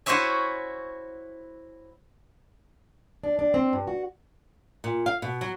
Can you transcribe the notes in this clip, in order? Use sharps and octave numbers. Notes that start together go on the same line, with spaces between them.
E4 F#4 C5 C#5 E5 G#5
D4
D4
C4
G2
F#4
A#2
F5
B2
F#3